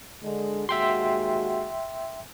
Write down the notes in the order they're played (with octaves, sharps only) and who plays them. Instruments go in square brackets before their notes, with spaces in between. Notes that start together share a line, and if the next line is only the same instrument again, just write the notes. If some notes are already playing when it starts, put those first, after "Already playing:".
[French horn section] D3 G#3
[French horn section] D#2 G#3 F#4 [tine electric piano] E5 G5 C6